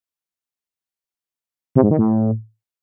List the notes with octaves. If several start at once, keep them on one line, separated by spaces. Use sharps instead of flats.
C3
G#2
D#3
A2